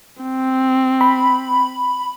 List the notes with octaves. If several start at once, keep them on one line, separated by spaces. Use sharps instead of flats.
C4
B5